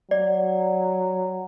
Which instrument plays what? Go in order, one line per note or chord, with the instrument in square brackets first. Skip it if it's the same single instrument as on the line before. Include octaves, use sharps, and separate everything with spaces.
[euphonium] F#3 [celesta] D5